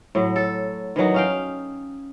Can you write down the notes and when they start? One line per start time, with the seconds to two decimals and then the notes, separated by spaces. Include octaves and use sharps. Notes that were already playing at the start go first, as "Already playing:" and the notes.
0.15 A2 F#3
0.36 A4
0.96 D#3 E3 F#3 D#4
1.14 C#4 F5 G5